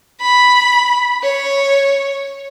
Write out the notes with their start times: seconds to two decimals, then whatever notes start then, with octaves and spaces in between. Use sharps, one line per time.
0.21 B5
1.23 C#5